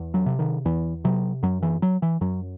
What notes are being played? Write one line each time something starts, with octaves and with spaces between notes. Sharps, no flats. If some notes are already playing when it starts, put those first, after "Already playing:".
Already playing: E2
F#3
C3
D#3
E2 E3
C3 F#3
F#2 F#3
E3
F#3
E3
F#2 F#3